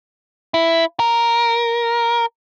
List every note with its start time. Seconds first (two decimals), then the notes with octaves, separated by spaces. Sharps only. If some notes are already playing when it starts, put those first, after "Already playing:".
0.54 E4
1.00 A#4